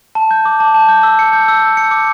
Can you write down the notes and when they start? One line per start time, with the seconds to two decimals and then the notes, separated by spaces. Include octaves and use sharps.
0.15 A5
0.31 G6
0.45 D6
0.60 A5
0.75 A5
0.89 G6
1.03 E6
1.19 C#7
1.33 G6
1.48 E6
1.62 E6
1.77 C#7
1.91 D6